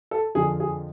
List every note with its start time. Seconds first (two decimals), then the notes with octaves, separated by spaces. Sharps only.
0.11 A4
0.35 F2 D3 F3 G#4
0.60 G#4